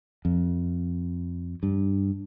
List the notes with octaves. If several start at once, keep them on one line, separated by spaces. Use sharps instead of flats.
F2
G2